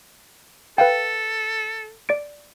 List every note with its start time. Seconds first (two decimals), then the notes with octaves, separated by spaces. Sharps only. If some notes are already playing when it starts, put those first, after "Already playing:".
0.78 A4 B4 F5 G5
2.09 D5 A6 D7